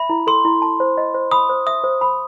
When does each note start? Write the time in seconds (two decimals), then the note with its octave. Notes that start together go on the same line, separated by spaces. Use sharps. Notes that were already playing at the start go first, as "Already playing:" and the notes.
Already playing: E5 B5
0.10 E4
0.27 A4 C6
0.45 E4
0.62 A5
0.80 C5
0.98 D#5
1.14 C5
1.32 B5 D#6
1.49 C5
1.67 E5 D#6
1.84 C5
2.01 B5